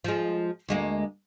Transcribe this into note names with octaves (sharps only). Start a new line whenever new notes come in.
F3 G#3
D2 G#3 A#3